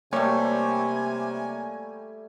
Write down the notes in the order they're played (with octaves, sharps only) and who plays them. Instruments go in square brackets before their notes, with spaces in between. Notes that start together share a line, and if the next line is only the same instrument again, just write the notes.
[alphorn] C3 [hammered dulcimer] G3 A3 [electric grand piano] A#3 C#5 [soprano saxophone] G#5